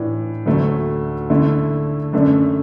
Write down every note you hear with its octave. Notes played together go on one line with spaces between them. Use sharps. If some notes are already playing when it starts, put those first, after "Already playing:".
Already playing: A2 E3 D4
D2 D3 F#3 A3
D3 A3 E4
F#2 D3 A3 D4